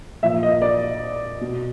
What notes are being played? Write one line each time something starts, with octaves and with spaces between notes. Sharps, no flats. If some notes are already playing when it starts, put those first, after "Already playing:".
A#2 F3 E5
D#5
D5
B2